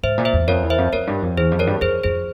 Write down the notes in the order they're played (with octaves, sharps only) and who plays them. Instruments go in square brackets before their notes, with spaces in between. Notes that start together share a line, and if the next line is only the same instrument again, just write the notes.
[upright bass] G#2 [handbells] C5 E5
[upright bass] A#2
[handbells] C5 E5
[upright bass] E2
[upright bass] F2 [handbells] A#4 C#5
[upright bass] E2
[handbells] C5 E5
[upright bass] F2
[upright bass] F2 [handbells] A#4 C#5
[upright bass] G2
F2
[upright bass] E2 [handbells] G#4 C5
[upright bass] F2
[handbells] A#4 C#5
[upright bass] G2
[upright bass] F2 [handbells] G#4 C5
[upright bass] F2 [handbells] G#4 C5